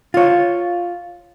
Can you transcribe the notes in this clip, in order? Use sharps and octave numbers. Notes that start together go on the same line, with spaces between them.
F4 C#5